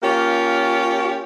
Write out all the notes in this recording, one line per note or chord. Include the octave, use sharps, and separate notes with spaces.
A#3 C#4 F4 G4